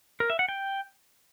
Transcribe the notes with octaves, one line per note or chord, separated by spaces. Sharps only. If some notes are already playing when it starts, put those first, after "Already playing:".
A#4
E5
F#5
G5